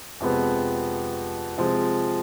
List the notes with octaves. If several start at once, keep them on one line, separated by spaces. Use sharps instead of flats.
F2 C3 F3 G#3 B3
C3 F3 G#3